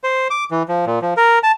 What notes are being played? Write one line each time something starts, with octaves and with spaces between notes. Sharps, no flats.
C5
D6
E3
F3
A#2
F3
A#4
A5